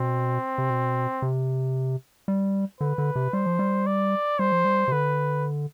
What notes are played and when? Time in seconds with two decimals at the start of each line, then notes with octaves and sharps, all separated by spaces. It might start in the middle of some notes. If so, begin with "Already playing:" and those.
Already playing: B2 C4
0.58 C3
0.70 B2
1.22 C3
2.28 G3
2.80 D3 B4
2.98 D3
3.16 C3
3.33 G3 C5
3.46 F3
3.59 G3
3.86 D5
4.39 G3 C5
4.52 F3
4.65 G3
4.88 C3
4.92 D3 B4